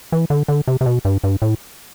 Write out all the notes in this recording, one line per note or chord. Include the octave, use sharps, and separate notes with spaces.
E3
D3
D3
C3
C3
B2
G2
G2
A2